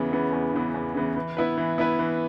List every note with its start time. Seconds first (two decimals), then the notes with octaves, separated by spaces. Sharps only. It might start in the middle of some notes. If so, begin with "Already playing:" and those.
Already playing: E2 C#3 E3 B3
0.12 C#3 E3 B3
0.33 E2
0.53 C#3 E3 B3
0.74 E2
0.95 C#3 E3 B3
1.16 E3
1.37 B3 E4 B4
1.58 E3
1.78 B3 E4 B4
1.99 E3